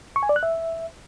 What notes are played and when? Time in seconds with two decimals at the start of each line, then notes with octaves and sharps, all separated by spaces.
0.16 C#6
0.23 G#5
0.29 D5
0.36 F#6
0.43 E5